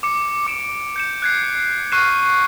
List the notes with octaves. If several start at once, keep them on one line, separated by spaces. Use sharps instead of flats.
D6 C#7
D6 D7 E7
G6 C#7 E7
F#6 G#6 C7
C#6 F6 F#6 C7 D#7 E7